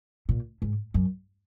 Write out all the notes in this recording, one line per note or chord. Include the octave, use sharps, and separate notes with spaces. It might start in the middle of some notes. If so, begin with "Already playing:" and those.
A#2
G#2
F#2